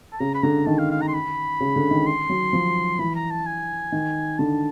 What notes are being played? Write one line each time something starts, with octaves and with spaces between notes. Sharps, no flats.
A5
C#3 A#5
B5
D3 A#5
D#3 A5
F5
F5
A#5
C6
B5
C#3
D3
D#3
C6
F#3
F3
E3 B5
A#5
A5
G#5
D#3
D3 A5